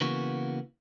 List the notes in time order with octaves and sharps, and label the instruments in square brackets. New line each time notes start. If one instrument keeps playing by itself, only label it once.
[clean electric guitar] C#3 E3 A#3 B3 F#4